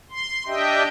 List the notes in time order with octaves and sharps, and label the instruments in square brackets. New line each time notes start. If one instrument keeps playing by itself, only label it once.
[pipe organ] C6
D4 G4 D#5 E5 G5